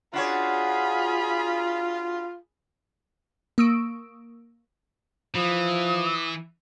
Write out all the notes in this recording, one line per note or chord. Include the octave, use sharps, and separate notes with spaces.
D4 F4 F#4 G#4 C#5 B5
A#3 C#6 D#6 E6 D7
E3 F3 D#6